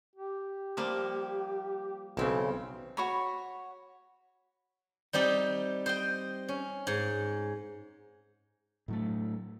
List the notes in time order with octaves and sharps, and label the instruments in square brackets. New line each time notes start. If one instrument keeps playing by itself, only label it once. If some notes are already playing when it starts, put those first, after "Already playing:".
[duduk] G4
[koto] F3 G3 A#3
[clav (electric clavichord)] B1 C#3 [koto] E3 C4
[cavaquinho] F#4 C#5 B5
[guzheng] G3 C4 D#4 G4
C5 D#5 G5
C#4
G#2
[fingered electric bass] A2 F#3 A3